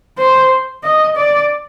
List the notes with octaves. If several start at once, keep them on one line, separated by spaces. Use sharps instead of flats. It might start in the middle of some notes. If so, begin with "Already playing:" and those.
C5
D#5
D5